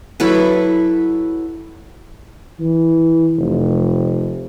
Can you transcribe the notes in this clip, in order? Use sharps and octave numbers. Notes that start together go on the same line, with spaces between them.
F#3 E4 A4 B4
E3
F1